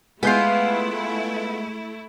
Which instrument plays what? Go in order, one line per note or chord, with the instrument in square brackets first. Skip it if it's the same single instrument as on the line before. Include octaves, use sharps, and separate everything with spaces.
[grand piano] G#3 G6 C7 [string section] A3 E4 [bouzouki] B3 F4